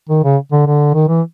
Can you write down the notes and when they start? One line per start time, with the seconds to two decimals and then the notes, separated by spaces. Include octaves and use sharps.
0.09 D#3
0.24 C#3
0.52 D3
0.66 D3
0.94 D#3
1.09 E3